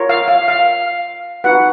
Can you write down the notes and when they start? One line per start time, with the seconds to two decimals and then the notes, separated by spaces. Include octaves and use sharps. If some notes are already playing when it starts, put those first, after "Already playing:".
Already playing: F4 A#4 C#5
0.09 F5
0.28 F5
0.48 F5
1.44 D#4 F#4 B4 F#5